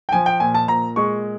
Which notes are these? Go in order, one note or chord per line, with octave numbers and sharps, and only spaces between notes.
G5
F3 G#5
G5
A#2 G#5
A5
A#2 A#5
G#3 C#6